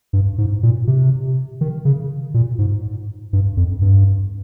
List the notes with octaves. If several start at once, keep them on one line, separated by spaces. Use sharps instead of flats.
G2
G#2
A#2
C3
D#3
C#3
A#2
G#2
G2
F2
G2